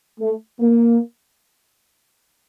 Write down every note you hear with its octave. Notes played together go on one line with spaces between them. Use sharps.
A3
A#3